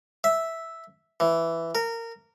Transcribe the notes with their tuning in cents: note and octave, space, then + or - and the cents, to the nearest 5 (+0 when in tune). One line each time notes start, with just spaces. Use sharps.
E5 -5
E3 +5
A#4 -20